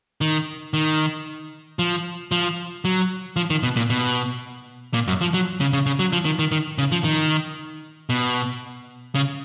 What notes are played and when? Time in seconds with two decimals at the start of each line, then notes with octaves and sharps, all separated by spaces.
0.21 D#3
0.73 D#3
1.79 F3
2.32 F3
2.85 F#3
3.36 F3
3.50 D#3
3.63 B2
3.76 A#2
3.90 B2
4.94 A#2
5.07 F#2
5.21 F3
5.34 F#3
5.61 C#3
5.73 C#3
5.86 C#3
5.99 F#3
6.13 F3
6.25 D#3
6.39 D#3
6.52 D#3
6.78 C#3
6.92 F3
7.04 D#3
8.09 B2
9.15 C#3